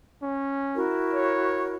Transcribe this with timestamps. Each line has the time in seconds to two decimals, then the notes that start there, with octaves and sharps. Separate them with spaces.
0.22 C#4
0.74 E4 F#4 A#4
1.14 C#5